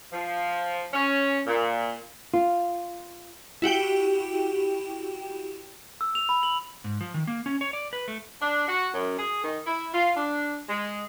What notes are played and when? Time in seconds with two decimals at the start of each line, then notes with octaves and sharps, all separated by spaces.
0.13 F3
0.93 C#4
1.47 A#2
2.34 F4
3.62 E4 F#4 G4 G5
6.01 E6
6.15 F7
6.29 B5
6.43 F#7
6.84 G#2
7.01 F3
7.14 D#3
7.27 A#3
7.46 C#4
7.61 C#5
7.73 D5
7.93 B4
8.08 A3
8.42 D4
8.68 F#4
8.94 F#2
9.19 G#4
9.44 D#3
9.66 E4
9.94 F4
10.16 D4
10.69 G#3